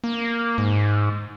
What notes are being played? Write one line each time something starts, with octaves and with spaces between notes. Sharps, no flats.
A#3
G#2